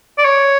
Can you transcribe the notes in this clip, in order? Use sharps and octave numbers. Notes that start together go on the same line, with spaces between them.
D5
C#5